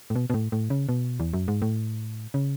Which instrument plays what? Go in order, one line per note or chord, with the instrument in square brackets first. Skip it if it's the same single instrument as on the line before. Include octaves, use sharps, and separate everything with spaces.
[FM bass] A2
B2
B2
A2
A2
C#3
B2
E2
F#2
G#2
A2
C#3